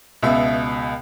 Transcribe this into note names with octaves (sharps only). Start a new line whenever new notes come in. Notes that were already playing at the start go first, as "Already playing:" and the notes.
C#2 B2 E5